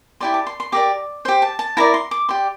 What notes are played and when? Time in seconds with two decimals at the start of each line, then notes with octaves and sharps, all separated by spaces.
0.20 E4 G4 D5 C6
0.34 A5
0.47 C6
0.60 C6
0.72 G4 A#4 D5 D6
1.25 G4 C5 C6
1.42 A5
1.59 A5
1.77 E4 A#4 D5 A#5
1.94 C6
2.11 D6
2.29 G4 D5 C6